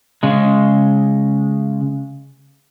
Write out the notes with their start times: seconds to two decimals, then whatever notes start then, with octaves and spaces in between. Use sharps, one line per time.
0.23 C#3 G#3